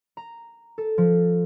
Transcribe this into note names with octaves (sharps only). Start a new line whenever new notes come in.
A#5
A4
F3